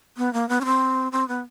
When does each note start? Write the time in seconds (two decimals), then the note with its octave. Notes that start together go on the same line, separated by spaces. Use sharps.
0.18 B3
0.33 A#3
0.49 B3
0.61 C#4
0.66 C4
1.12 C4
1.28 B3